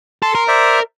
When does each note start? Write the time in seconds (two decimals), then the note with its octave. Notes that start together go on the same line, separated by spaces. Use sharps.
0.22 A4 C6
0.35 A#4
0.48 C5 D5 E5